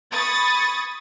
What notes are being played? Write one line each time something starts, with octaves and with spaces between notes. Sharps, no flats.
B5 C#6 D#6 G#6 A6